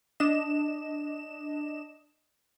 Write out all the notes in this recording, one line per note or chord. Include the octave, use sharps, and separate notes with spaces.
D4 D#5 E7